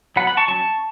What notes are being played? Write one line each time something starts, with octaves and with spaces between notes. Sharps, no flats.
F#3 B3 F#5 B5
F#5 B5
A5 C#6
F#3 C#4 A5 C#6